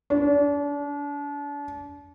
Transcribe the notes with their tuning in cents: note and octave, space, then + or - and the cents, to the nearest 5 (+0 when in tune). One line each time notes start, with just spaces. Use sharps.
D4 -35